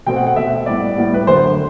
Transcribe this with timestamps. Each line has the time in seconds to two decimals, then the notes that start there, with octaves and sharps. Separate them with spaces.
0.07 B2 A3 C4 G5
0.16 F#5
0.27 F#5
0.36 B2 A3 C4 E5
0.66 A2 G3 B3 D5
0.97 A2 G3 B3
1.14 B4
1.27 F#2 D3 A3 C5